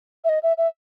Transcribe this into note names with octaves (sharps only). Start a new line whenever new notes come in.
E5
D#5
E5
E5